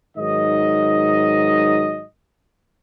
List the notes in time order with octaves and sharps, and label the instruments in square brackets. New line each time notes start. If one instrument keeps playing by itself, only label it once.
[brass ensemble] G#2 D#3 F#3 D#5